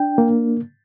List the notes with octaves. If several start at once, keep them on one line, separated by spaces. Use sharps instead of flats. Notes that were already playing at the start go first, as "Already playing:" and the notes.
Already playing: D4 G5
A#3